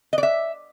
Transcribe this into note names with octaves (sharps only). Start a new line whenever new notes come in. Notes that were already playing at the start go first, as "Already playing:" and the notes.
D#5
D5
E5